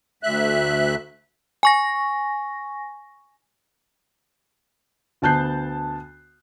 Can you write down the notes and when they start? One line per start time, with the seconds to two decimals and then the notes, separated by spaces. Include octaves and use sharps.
0.23 D2 E5 F#6
1.63 G#5 C#6 A#6
5.22 D2 B3 A5 F#6 G6 C7